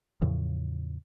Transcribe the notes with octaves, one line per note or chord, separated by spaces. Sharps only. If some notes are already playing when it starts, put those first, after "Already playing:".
E2 A2 C#3 F3